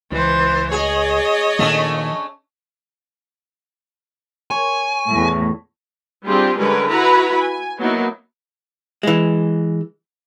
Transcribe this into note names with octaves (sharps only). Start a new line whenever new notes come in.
C#2 E3 C5
G#4 C#5 D#5
A#2 D#3 F3 A3 C#4 D4
C#5 G#5
E2 A2
G3 C4 D4 F4 G4 G#4
D3 G3 G#3 C#4 A#4 B4
E4 F#4 B4 A#5 B5
G#5
F#3 A#3 B3 D#4 E4
E3 G#3